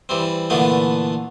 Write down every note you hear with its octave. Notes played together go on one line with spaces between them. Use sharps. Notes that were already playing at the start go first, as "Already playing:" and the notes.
E3 G3 C4
A#2 D3 E3 A3 B3